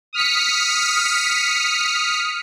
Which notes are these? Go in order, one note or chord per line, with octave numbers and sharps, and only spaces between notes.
D#6 F6 B6 C#7